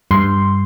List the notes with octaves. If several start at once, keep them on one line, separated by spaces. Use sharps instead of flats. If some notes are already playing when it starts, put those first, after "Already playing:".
G2 C6